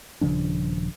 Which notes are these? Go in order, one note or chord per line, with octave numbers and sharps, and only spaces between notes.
D#1 C#3 F3 D4